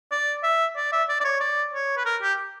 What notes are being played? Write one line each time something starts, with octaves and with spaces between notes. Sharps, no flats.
D5
E5
D5
E5
D5
D5
C#5
D5
C#5
B4
A#4
G4